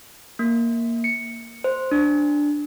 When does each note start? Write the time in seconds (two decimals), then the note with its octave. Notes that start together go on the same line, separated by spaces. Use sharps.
0.39 A#3
1.04 C#7
1.64 C5
1.91 D4